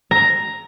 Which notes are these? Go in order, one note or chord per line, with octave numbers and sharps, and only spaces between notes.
A#5